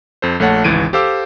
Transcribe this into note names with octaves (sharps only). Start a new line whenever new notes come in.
F2 A4 C5
A#1 A3 A4 C#5 F#5 A5
G#1 C#2 E3 D7 D#7
G4 A4 C5 F5 D6 E6